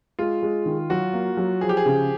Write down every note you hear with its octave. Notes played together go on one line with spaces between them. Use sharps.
G#3 F4
G#3
D#3
F#3 F#4
A#3
F#3
F3 G#4
G4
G#4
C#3